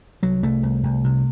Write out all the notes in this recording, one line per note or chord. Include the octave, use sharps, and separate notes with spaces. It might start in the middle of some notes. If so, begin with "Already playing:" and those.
C2 F#3
C2 A3
C2
C2
C3